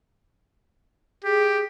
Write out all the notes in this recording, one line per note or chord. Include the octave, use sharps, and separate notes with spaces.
G4 G#4